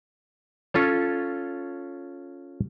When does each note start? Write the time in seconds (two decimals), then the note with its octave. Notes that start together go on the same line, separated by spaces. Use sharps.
0.74 C#4 F4 A4 C#5